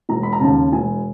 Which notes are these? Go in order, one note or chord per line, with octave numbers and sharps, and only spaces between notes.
E1 A#5
B5
A#5
D#2 C#3 A5
E1 G#5